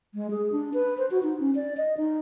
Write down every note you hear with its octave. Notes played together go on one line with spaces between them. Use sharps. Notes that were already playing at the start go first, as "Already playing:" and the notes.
G#3
G#4
D4
B4
C5
F#4
D#4
C#4
D5
D#5
D#4